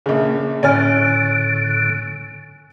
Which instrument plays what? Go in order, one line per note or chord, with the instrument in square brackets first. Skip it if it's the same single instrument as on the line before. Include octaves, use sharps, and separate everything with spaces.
[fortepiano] A#1 C#3
[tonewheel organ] A2 D3 [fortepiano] C#4 G#5 F6